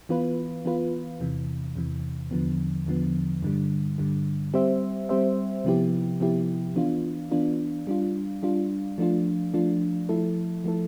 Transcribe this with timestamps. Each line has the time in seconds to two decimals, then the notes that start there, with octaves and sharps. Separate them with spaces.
0.09 E3 B3 F4 B4
0.65 E3 B3 F4 B4
1.20 E2 C3 E3
1.76 E2 C3 E3
2.31 E2 D3 F3 B3
2.86 E2 D3 F3 B3
3.43 G2 D3 G3
3.98 G2 D3 G3
4.54 G3 C4 G4 C5 E5
5.09 G3 C4 G4 C5 E5
5.65 C3 F3 B3 E4 G4
6.20 C3 F3 B3 E4 G4
6.76 E3 B3 D4 F4
7.31 E3 B3 D4 F4
7.87 G3 D4 F4
8.43 G3 D4 F4
8.98 F3 A3 D4 F4
9.54 F3 A3 D4 F4
10.09 F3 A3 E4 A4
10.64 F3 A3 E4 A4